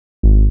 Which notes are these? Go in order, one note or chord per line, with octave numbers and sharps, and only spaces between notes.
G#1